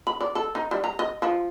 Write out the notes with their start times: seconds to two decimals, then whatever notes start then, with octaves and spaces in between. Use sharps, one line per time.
0.07 B5
0.21 D5
0.35 A4
0.55 D#4
0.71 G3
0.84 A#5
0.99 D#5
1.22 F3